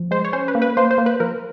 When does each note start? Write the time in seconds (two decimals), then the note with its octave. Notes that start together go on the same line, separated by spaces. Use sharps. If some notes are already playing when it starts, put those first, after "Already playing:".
Already playing: F3
0.11 G#3 C5
0.25 C#5
0.33 C#4 C5
0.48 B4
0.55 A#3
0.62 B4
0.77 A#3 C5
0.91 C5
0.98 A#3
1.06 B4
1.20 F3 A#4